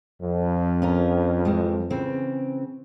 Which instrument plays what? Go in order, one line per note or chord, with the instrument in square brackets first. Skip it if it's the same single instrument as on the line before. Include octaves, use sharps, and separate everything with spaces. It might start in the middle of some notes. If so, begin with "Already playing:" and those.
[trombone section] F2
[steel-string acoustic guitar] C#4 F4 A#4
E3 G3 G#3
C#3 E3 C4